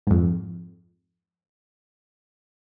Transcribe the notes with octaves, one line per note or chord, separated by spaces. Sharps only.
F2 G#2